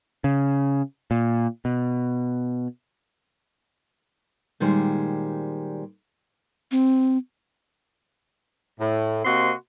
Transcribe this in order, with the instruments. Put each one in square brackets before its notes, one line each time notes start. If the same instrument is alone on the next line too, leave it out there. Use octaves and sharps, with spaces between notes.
[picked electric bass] C#3
A#2
B2
[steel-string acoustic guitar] A#2 D#3 G3 G#3 C5
[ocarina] C4
[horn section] A2
C3 A#3 C4 F#4 D#5 C6